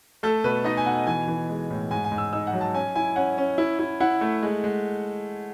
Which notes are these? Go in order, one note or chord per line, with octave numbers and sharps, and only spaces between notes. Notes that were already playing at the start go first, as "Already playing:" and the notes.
A3 A4
B2 B4
D#4 D#5
G#5
B2 F#5
E3 G#5
E3
G#3
A2
G#2 G#5
G#5
G#2
E6
D#4 E6
F#5
F#3
A5
C#4 G#5
E4 G#5
C#4 F#5
C#4
E4
E4
E4 F#5
A3
G#3
G#3